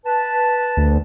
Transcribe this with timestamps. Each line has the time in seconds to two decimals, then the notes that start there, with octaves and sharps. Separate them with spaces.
0.05 B4 A5
0.77 D2